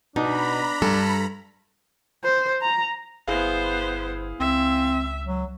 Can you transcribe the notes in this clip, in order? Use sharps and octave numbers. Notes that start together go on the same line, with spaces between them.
B2 D4 D#4 A#5 B5
G2 A4
C5
A#5
G1 B3 E4 G#4 C5 F5
C#2 C4 E5
F#3